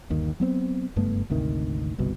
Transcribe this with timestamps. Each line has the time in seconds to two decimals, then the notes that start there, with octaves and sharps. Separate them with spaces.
0.10 G1 D#2 D#3
0.40 F#3 B3 C4
0.96 F#1 G2 A3 B3
1.30 G#1 D2 C3 D#3
1.98 G1 C2 B2